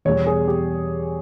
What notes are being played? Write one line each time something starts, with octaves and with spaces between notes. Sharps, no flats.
E2 B2 G3 C#5
G#4
G4